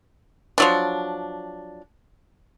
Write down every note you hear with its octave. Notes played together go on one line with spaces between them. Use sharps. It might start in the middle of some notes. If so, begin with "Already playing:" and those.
F3 F#3 D4